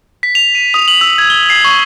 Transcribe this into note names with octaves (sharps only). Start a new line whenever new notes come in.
B6
F7
D#7
D#6
F#7
E6
G#6
G7
C7
C#6